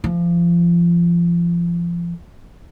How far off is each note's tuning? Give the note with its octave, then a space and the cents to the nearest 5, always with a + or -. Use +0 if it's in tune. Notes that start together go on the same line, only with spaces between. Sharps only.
F3 -30